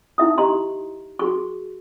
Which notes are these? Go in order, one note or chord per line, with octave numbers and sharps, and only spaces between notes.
D#4 E4 E5 D#6
G4 D#5 A#5 C6
F#4 G#4 C#6